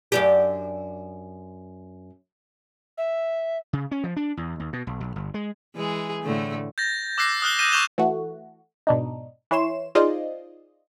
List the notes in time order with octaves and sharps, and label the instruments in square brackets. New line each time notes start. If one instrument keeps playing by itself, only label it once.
[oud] F#2 D4 G4
[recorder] E5
[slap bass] C#3
C#4
F3
D4
E2
D#2
B2
B1
B1
G1
G#3
[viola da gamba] E3 G#3 G#4
A2 D3 A3
[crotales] G6 A6 A#6
D6 E6 F#6 A#6 C7
D#6 F6 F#6 G7
F6 G6 A#6 D#7 E7 G7
C#6 E6 G6 E7 F7 G7
[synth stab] E3 A3 F#4
G#2 B2 D4 D#4
E3 E4 C#5 C6 E7
D#4 F4 G#4 C5 D5 D#5